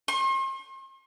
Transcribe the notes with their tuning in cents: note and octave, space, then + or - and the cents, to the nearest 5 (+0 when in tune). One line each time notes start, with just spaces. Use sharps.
C6 +45